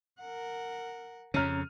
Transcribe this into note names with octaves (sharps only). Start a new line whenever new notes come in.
A#4 F#5
F2 C#3 C#4 A#5 F6 D#7